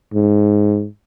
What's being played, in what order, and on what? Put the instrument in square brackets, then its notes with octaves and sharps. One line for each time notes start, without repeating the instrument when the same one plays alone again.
[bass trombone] G#2